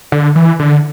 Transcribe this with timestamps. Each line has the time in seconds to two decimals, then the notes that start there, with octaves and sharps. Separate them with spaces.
0.12 D3
0.35 E3
0.59 D3